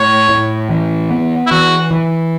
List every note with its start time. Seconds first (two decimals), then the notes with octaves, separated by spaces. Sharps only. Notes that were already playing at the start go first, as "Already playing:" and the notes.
Already playing: A2 C#5
0.29 A2
0.70 E3
1.11 B3
1.46 E4
1.51 E3 F#4
1.91 E3